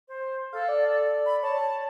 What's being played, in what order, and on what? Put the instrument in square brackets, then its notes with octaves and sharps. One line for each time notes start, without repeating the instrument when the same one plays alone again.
[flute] C5
[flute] A4 [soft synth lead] F5
[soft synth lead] D5
[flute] B5
[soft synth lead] C#5 [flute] A5